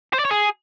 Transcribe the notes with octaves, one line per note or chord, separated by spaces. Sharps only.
C5
D5
C#5
G#4